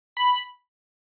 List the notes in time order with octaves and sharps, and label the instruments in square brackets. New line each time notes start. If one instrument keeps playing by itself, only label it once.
[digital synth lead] B5